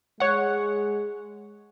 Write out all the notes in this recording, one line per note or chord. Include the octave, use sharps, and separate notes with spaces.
G#3 C#5 F#5